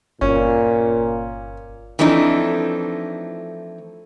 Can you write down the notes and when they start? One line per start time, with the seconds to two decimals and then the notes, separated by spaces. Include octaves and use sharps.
0.21 G1 A#2 C#4
1.99 E3 F3 A3 C4 D4 D#4